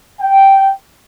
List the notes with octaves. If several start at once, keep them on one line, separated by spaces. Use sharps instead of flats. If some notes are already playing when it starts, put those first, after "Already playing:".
G5